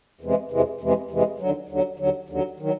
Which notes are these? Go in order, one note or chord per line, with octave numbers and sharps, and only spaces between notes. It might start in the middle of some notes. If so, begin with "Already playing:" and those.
E2 C3 E3 G#3
E2 C3 E3 G#3
E2 C3 E3 G#3
E2 C3 E3 G#3
D#2 D3 F#3
D#2 D3 F#3
D#2 D3 F#3
D#2 D3 F#3
D#3 F#3